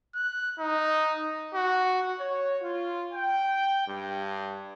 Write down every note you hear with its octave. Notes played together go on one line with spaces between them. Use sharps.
F#6
D#4
F#4
C#5
F4
G5
G2